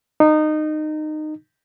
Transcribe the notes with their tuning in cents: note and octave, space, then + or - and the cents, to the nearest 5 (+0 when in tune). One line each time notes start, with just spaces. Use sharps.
D#4 -20